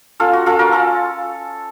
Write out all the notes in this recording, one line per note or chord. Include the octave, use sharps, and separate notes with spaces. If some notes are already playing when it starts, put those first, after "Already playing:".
C#4 F4 A4
F#4
C#4 F4 A4
F#4 A#4
C#4 F4 A4